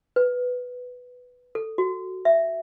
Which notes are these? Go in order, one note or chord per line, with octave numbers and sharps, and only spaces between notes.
B4
A4
F#4
E5